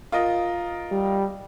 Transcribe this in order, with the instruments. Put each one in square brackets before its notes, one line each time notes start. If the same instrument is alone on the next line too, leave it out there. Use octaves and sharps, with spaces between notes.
[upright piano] F4 A#4 D#5
[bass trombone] G3